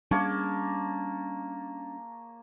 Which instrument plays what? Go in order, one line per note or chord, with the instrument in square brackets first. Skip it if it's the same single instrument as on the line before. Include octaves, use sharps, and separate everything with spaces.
[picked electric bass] G3 C#4 D4 [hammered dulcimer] A#3 C#5 A5